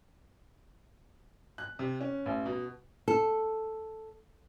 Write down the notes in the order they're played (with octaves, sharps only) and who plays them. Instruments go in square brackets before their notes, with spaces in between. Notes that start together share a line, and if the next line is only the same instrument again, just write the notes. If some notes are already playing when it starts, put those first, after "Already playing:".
[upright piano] F#6
C3
C#4
A1
B2
[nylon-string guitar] A4